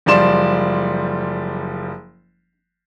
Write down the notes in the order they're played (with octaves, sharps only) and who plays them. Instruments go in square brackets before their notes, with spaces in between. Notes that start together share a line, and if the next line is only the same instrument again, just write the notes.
[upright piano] F#1 F3 G3 D5 C6 E7